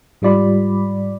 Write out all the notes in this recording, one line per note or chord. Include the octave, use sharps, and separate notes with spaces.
G#2 G3 F4 D5 B5